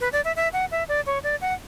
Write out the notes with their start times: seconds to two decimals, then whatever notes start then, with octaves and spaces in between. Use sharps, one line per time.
0.01 B4
0.13 D5
0.25 E5
0.36 E5
0.53 F#5
0.71 E5
0.89 D5
1.06 C#5
1.24 D5
1.41 F#5